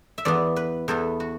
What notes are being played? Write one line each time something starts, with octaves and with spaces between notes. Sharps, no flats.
E5
E2 E3 B3 D5
B4
E2 E3 B3 A4
F#4